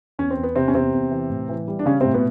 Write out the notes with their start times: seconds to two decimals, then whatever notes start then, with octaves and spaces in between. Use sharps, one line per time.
0.19 E2 C#4
0.31 C4
0.37 E2
0.43 B3
0.56 C3 C4
0.68 C#4
0.74 E2 C3 C4
0.93 E2
1.11 E3
1.30 A2
1.49 E3
1.68 G3
1.79 D4
1.86 C#3 G3 C#4
2.01 A2 C3 C4
2.14 B2 B3